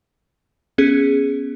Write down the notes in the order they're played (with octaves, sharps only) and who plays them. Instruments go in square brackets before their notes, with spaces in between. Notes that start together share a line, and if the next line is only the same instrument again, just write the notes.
[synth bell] B3 C#4 G#4